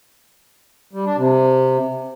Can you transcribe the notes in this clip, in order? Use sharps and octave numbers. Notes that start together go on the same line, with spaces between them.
G3
D4
C3